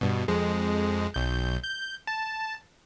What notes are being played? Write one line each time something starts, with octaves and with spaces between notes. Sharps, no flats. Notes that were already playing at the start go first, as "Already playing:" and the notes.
G2 B2
F2 G#3
B1 G6
G6
A5